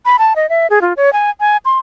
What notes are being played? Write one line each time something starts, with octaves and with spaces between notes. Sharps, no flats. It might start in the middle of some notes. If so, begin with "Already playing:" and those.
B5
A5
D#5
E5
G#4
F4
C#5
G#5
G#5
C6